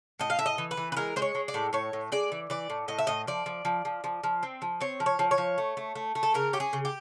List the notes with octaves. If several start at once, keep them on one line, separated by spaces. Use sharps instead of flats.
A2 D#5
F5
A2 E5
D#5
E3
B4
E3
B4
G#3 A#4
G#3 C5
C#5
G#3
D5
A2
A2 C#5
A2
G#3 D5
E3
E3 D5
A2
A2 D#5
E5
A2 D#5
F3 D5
F3
F3
F3
F3
F3
C4
F3
C4 C#5
F3
C#5
F3
C#5
F3
A3
A3
A3
A3
A4
C#3 A#4
C#4 G4
G#4
C#3
G4